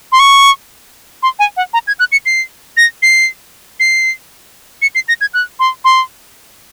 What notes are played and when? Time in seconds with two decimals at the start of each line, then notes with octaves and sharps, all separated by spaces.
0.12 C6
0.19 C#6
1.23 C6
1.39 G#5
1.57 F#5
1.73 A#5
1.87 G#6
1.99 F#6
2.12 C#7
2.26 C7
2.77 A#6
3.02 C7
3.80 C7
4.82 C#7
4.95 C7
5.08 A#6
5.21 G#6
5.34 F#6
5.59 C6
5.84 C6